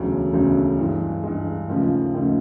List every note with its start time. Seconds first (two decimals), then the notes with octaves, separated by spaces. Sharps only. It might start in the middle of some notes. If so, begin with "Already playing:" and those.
Already playing: E1 D2 C#3 F#3
0.33 E1 D2 C#3 F#3
0.78 G2 E3 G#3
1.23 G2 E3 G#3
1.69 D#2 C#3 F3 A3
2.14 D#2 C#3 F3 A3